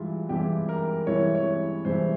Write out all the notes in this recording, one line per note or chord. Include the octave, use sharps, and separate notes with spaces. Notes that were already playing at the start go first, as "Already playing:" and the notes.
Already playing: G2 E3 G#3 E4 F4
G2 E3 G#3 E4 G4
A#4
G2 E3 G#3 E4 C#5
C#5
G2 E3 G#3 E4 C5